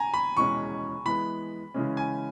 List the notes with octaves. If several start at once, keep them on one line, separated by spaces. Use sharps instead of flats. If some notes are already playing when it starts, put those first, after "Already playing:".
Already playing: G#5 A#5
B5
E2 B2 G#3 C#4 C#6
E3 G#3 B3 B5
C#3 E3 G#3 C#4
G#5